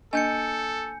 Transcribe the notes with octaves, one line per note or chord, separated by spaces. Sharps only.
A#3 D4 A4 D#5 G#5 G6 C#7